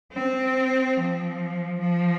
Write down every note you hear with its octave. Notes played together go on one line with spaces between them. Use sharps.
C4
F3
F3